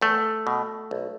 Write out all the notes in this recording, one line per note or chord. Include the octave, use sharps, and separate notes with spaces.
E2 A3
B2
B1